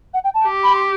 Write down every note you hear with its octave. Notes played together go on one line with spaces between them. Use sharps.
F#5
G5
A5
G4
B5
C6